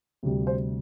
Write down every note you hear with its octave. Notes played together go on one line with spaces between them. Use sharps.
D2 C3 G3
C5